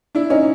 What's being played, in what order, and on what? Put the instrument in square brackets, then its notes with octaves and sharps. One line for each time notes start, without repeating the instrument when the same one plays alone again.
[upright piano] D4 E4
C#4 D#4